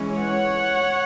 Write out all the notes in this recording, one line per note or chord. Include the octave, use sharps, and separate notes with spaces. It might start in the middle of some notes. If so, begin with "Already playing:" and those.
Already playing: E3 G#3 C#4
C#5 F#5